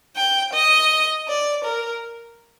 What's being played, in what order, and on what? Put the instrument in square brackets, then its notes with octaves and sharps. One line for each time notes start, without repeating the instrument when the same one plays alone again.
[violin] G5
D#5
D5
A#4